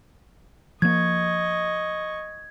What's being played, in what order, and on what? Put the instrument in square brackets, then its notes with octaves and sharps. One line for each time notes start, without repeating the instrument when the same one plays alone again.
[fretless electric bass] F3 A#3 [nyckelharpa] D#5 C#6 [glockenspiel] G#6